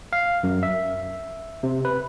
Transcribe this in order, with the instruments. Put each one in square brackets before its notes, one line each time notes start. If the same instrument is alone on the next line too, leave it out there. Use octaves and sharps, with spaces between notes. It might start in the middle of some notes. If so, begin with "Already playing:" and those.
[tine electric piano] F5
F#2
E5
C3
B4